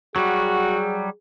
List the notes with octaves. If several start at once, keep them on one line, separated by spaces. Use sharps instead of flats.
F#3 G3 F#4 G#4